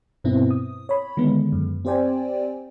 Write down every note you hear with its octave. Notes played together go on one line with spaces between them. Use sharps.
G2 B2 B3 C4 E4
D#6
C#5 B5
D3 D#3 G#3 B3
F#2
C4 G4 C5 D5 G5 G#5